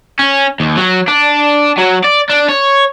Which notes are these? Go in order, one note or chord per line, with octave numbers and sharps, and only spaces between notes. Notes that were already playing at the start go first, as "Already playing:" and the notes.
C#4
D#2
F#3
D4
F#3
D5
D4
C#5